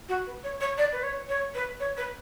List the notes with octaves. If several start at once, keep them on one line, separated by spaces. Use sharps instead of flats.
F#4
B4
C#5
C#5
D5
B4
C#5
C#5
B4
C#5
B4